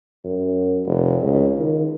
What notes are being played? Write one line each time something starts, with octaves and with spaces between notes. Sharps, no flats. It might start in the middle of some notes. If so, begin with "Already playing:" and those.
F#2
F1
C#2
D#3